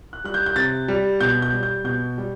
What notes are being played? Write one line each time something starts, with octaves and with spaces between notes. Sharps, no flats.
F#6
G3 F#6
G6
G6
C3 A6
G3
B2 G6
G6
G3
G6
B2 G6
G3